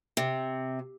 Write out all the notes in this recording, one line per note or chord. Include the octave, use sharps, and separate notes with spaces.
C3